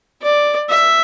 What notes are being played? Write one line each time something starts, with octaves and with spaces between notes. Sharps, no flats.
D5
E5